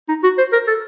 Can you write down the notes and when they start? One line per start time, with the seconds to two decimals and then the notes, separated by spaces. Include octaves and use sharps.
0.09 D#4
0.23 F#4
0.38 C5
0.52 A#4
0.67 A4